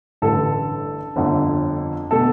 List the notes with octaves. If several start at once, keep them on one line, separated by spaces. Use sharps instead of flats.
A1 G2 D3 A4
G1 F2 D3
B2 A4